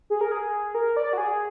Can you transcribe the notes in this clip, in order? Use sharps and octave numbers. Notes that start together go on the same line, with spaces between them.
G#4
A#4
G#4
A#4
D5
F#4
G#4